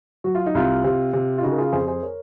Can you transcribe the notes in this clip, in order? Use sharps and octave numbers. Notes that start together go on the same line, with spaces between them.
F#3 F#4
F4
D#4
C2 F4
C3
C3
F4
C#3 D#4 F#4
A#4
F4 G#4
F2 G#4 C5
G#4 C5
A#4 C#5